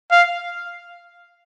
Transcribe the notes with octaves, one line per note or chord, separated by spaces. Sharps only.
F5